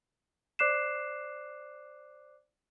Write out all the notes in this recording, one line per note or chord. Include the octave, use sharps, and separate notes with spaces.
C5 D5 D6 F#6 C7 E7